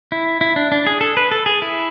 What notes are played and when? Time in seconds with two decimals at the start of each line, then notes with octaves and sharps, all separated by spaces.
0.12 E4
0.41 E4
0.56 D4
0.72 D4
0.87 G#4
1.01 A4
1.17 B4
1.32 A4
1.46 G#4
1.62 E4